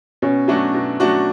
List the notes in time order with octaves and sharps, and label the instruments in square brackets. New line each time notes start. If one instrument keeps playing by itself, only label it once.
[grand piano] B2 [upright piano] C#4
[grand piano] F#3 A3 D4 F#4
B2
F#3 A3 D4 F#4